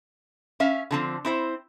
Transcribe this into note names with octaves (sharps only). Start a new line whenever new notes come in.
C#4 E5 F5
D3 F3 C4
C4 E4 C5